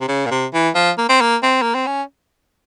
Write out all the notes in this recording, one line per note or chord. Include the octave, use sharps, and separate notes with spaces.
C3
C#3
A#2
C3
E3
F3
A#3
C4
A#3
C4
A#3
C4
C#4